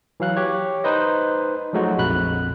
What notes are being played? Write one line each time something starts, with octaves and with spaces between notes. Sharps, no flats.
E3 F#3 F5 F#6
G4 C#5
D#4 B4 C5 D#5
F3 F#3 G#3 A3 D#4 F#4
A#1 F2 B5 F#6